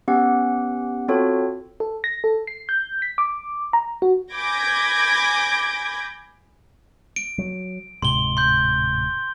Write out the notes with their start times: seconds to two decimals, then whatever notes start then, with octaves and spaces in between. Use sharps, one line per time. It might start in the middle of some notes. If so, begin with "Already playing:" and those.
0.08 B3 C#4 G4 F#5
1.08 C4 F4 F#4 A4 C#5
1.80 A4
2.04 A#6
2.24 A4
2.47 C7
2.69 G6
3.02 B6
3.18 D6
3.73 A#5
4.02 F#4
4.34 G#5 B5 D6 G6 G#6 A#6
7.16 D7
7.38 F#3
8.02 D1 G#2 C3 C6 G7
8.37 C6 G6